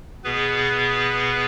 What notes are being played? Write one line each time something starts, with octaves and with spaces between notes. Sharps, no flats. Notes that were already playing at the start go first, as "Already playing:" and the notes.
B2 B3 G#4 B4